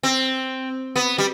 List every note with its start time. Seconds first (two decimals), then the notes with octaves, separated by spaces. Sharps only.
0.03 C4
0.96 B3
1.18 G3